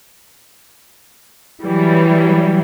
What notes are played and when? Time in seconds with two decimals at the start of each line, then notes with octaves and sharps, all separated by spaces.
1.63 E3 F#3 G3